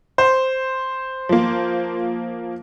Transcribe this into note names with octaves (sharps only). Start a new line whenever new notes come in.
C5
F3 A#3